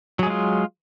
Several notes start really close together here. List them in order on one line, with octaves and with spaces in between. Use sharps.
F#3 G#4 G#3 F4